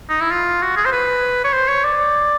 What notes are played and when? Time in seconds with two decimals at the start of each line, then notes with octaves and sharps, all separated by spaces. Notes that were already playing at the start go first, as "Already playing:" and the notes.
0.09 D#4
0.21 E4
0.31 F4
0.62 F#4
0.76 G#4
0.85 C5
0.92 B4
1.44 C#5
1.54 C5
1.68 C#5
1.84 D5